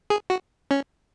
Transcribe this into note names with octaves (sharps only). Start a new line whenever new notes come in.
G#4
F#4
C#4